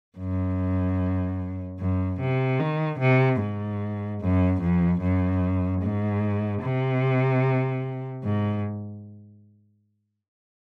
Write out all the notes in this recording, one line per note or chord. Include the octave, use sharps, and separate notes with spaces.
F#2
F#2
C3
D#3
C3
G#2
F#2
F2
F#2
G#2
C3
G#2